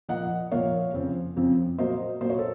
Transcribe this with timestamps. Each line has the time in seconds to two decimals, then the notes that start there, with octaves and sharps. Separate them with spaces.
0.09 A#2 F3 A#3 D#5 F#5
0.51 A#2 F3 A#3 C#5 F5
0.93 F2 C#3 F3 C4
1.36 F2 C#3 F3 C4
1.78 A#2 F#3 A#3 C5 D#5
2.21 A#2 F#3 A#3 C5
2.30 C#5
2.39 A4